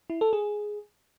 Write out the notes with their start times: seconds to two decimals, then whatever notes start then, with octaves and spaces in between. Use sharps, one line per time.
0.10 E4
0.21 A4
0.33 G#4